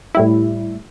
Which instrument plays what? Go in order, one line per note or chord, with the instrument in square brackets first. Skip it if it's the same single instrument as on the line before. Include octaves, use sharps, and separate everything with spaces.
[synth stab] A2 G3 E4